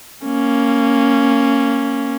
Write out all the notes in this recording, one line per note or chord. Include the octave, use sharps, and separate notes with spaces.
A#3 C#4